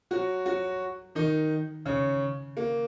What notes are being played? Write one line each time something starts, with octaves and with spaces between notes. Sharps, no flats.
F#3 F#4
F#3 F#4
D#3 D#4
C#3 C#4
A#3